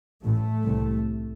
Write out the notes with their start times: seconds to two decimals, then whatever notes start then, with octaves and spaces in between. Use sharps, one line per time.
0.23 A1 A2 A3
0.64 C2 C3